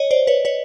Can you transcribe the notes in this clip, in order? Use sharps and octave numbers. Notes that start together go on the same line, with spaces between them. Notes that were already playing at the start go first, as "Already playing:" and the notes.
Already playing: C#5 D#5
C5 D5
B4 C#5
B4 C#5